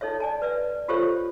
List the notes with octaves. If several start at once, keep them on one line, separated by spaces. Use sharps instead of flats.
D#4 A4 C#5 E5
D5 G#5 A5
B4 D5 E5
F4 G4 A4 C5 C#5 E5